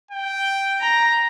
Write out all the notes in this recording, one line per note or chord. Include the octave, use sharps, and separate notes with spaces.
G5
A#5